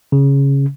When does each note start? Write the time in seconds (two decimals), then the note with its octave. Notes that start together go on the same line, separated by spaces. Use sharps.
0.12 C#3